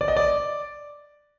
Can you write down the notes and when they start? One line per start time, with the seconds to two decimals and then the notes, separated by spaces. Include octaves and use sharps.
0.01 D5
0.08 D#5
0.17 D5